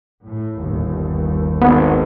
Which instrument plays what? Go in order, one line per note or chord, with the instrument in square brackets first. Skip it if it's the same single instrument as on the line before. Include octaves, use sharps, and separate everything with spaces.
[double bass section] A2
G1 D#2
[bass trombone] G#1 [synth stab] B3